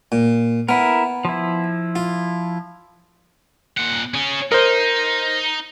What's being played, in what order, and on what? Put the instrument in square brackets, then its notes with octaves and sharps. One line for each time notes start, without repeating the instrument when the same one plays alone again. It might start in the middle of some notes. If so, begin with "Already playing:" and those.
[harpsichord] A#2
[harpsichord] B3 [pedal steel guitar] E4 A#4
[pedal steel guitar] F3 E4
[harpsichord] F4
[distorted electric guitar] A#2 F#5
C#4 G#4
[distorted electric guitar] D#4 [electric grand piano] A#4 C5